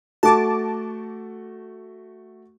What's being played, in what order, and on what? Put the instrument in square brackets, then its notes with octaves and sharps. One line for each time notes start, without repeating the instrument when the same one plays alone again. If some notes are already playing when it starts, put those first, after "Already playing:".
[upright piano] A3 F#4 [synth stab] A5 D6